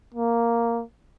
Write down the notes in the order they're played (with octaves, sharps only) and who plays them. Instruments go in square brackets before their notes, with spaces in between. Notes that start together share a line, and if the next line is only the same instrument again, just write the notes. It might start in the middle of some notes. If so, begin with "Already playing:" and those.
[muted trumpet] A#3